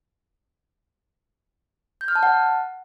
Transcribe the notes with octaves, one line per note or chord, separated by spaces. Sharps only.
G6
F6
A5
F#5